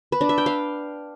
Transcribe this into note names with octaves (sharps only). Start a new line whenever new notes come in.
B4
D4
E5
G5
F5